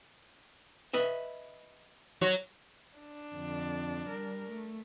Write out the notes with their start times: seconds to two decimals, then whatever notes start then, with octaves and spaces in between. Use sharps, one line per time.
0.94 B4 D#5 E5
2.21 F#3 F#4 C#5
2.99 D4
3.34 F2 D3
4.07 G3 A#4
4.50 A3